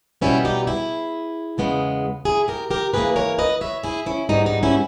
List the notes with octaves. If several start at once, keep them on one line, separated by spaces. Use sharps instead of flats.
B2 G3 B3 C#4 E4
D#4 G4
E4 G#4
E2 C#3 G#3 B3
E4 G#4
G4 A#4
G4 A#4
G#2 E3 A#3 G#4 B4
A#4 C#5
B4 D#5
C#5 E5
E4 G#4
C#4 E4
G#2 G3 B3 D#4
D#4
C#4 E4